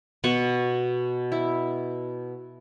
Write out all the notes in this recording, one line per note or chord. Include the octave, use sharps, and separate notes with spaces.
B2 F#4 C#6
E4